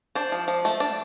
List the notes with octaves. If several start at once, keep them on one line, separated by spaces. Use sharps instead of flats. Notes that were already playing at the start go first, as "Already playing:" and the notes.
D4 C5
F3
F3
A3
D4